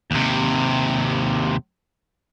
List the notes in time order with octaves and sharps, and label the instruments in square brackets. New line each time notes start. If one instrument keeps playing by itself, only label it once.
[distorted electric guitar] D#2 C3